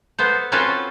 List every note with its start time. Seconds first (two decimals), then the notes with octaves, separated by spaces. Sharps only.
0.18 B3 A4 C5
0.52 C4 C#4 F4 F#4 A4 B4